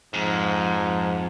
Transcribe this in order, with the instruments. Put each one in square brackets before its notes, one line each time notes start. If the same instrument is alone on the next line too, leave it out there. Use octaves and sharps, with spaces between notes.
[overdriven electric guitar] F2 [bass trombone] G#2